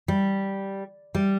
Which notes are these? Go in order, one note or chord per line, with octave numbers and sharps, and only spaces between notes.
G3
G3